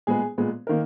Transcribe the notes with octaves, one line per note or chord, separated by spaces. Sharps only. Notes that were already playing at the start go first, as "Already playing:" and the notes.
A#2 G#3 B3 G#4
A#2 G#3 B3
D#3 A#3 A#4